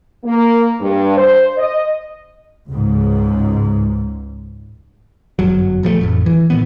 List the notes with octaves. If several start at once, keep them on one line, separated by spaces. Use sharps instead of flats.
A#3
G2
C5
D#5
C#2 G#2
G1 F#2 F#3
D#1 F3 F#3 A3
A1 F2
E3
A#2 D#3 B3